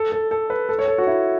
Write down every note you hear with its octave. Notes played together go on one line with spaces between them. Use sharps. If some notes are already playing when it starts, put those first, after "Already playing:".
Already playing: A4
A4
A4
B4
A4
C#5
A4
F#4
E4